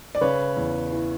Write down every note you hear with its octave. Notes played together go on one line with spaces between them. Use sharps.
D5
C#3 B4 C#5
E2
E3